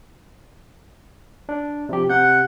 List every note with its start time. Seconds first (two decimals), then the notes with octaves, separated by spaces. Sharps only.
1.49 D4
1.89 C3 F3 G4
2.10 C3 F#5 G6